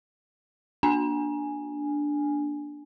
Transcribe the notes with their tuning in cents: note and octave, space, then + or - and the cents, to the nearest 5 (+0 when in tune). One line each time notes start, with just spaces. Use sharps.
A#3 +25 D4 +0 G#5 +0